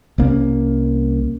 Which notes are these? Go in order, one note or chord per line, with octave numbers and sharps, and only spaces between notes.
C2 A#3 C#4